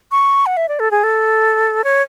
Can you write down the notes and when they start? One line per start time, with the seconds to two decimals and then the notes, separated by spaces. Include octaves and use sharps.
0.11 C#6
0.46 F#5
0.57 E5
0.69 D5
0.80 A4
0.91 G#4
1.04 A4
1.84 C#5